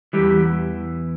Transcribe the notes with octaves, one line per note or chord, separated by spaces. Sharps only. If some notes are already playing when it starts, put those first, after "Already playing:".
E2 E3 G3